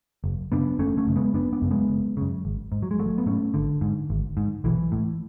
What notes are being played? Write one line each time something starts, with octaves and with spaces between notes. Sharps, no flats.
F#1
F#2 C#3 B3 D4
F#1 A3 C#4
A3 C#4
F#2 C#3
G#3 B3
F#1 B3 D4
B3 D4
F#2 C#3
G#3 B3
F#1
F#2 C#3
G#1
G#2
F#3
G#3
G#1 F#3 A3
B3
G#2 A3 C#4
G#1 D3
G#2
G#1
G#2
B1 E3
A2